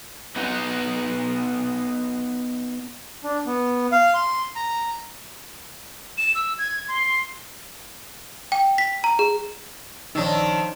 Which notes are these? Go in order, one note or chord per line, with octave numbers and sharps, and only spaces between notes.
B3 D#4 F#4
D4
B3
F5
C6
A#5
E7
E6
G#6
C6
G5
B6
A#5
G#4
A#1 D#3 F3 D4 D#4 C#5 E6